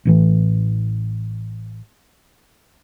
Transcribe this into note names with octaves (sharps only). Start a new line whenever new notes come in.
A1 A2 E3